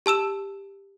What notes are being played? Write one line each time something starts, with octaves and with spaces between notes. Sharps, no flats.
G4 A5 E6 E7